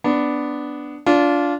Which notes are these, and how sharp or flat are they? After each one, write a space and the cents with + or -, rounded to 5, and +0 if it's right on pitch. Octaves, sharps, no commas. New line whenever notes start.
B3 +5 D4 +0
D4 -20 F4 +5